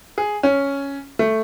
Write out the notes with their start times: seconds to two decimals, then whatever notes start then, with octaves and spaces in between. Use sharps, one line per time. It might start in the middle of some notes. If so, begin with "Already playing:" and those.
0.18 G#4
0.43 C#4
1.19 A3